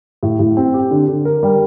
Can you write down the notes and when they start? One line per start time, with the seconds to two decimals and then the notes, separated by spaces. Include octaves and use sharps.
0.23 A2
0.39 A2
0.57 C4
0.74 G4
0.91 D3
1.08 D3
1.25 A#4
1.43 G3